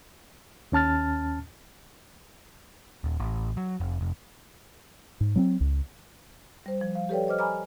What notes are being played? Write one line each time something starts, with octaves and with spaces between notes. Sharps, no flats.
D#2 C#4 A5 F6 A6
D#1
A1
F#3
F1
F1
G#2
F#3 A#3 C4
C#2
G3 C5
F3
F5
G4 A4 B4 C#5 D5 G5
C5 D#5 D6 F6
G#5 A#5 B5 D6 F6